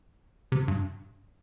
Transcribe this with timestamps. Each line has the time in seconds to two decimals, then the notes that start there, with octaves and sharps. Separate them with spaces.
0.52 C3
0.68 G2